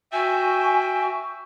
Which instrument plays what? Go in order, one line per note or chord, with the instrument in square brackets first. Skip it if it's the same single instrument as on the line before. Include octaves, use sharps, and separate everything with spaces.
[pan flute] F#4 [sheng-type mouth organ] E5 G5 [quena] G#5